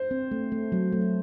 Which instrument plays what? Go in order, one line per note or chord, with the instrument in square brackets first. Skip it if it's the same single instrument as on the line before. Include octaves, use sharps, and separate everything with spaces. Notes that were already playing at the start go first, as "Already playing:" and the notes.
Already playing: [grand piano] C5
[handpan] C4
A3
A3
F#3
A3